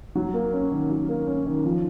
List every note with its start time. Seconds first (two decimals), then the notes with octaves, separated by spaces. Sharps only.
0.15 F#3
0.34 A#3
0.53 C#4
0.71 D#3
0.90 F#3
1.09 A#3
1.27 C#4
1.46 D#3
1.65 F3